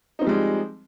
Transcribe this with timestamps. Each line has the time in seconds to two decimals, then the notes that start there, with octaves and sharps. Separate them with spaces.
0.19 D#4
0.21 C4
0.24 F3
0.26 G3
0.29 G#3